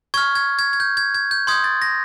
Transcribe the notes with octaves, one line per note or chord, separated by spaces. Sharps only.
C#6 F6 G#6
G#6
G#6
G#6
G6
G#6
G#6
G6
C6 D#6 G6 G#6
A6
A#6